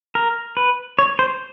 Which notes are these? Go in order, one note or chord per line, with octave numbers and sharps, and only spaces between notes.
A#4
B4
C#5
C5